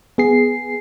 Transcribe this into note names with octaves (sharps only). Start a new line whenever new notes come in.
B3 G#4 C7